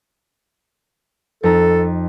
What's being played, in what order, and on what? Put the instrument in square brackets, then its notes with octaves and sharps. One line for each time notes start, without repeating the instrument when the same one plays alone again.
[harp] F2 D#4 A#5 [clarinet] A4